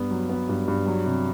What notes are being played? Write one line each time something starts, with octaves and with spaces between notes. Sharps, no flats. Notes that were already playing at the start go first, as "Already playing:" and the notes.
Already playing: G2 B3
F#3
B3
G2
G2
F#3
C3